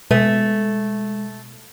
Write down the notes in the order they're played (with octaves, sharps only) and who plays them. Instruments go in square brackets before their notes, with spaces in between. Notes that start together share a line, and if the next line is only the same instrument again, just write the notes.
[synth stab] B2 [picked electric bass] G#3 [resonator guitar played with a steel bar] A3